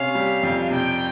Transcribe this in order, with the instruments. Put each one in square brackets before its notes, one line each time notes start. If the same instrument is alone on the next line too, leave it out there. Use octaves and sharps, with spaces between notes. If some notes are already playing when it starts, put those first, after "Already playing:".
Already playing: [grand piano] C3 C#4 [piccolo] F5
[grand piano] G3
F2
[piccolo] F5
[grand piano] C3 [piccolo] G5